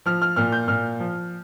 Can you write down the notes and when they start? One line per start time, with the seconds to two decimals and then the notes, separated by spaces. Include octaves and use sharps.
0.06 F3 F6
0.22 F6
0.36 A#2 F6
0.52 G6
0.68 A#2 F6
1.00 F3